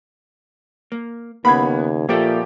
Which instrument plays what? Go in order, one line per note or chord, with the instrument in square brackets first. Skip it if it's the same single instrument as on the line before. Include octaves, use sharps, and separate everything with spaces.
[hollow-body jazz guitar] A#3
[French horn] D#2 [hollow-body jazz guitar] C#3 A#3 [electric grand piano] B3 F#5 G#6 [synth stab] B5
[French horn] A#2 [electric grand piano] F3 G4 D7 [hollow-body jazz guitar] A#3 A4 E5